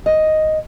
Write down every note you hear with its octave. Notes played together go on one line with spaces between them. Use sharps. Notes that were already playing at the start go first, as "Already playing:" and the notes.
D#5